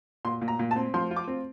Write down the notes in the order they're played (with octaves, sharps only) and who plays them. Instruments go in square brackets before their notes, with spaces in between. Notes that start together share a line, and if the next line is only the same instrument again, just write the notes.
[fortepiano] A#2 C6
A#2
A#5
A#2
A5
C4
F3 C6
F4
D6
C4